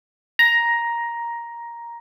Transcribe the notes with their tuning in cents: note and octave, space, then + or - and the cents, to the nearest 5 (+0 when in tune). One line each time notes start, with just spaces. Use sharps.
A#5 +10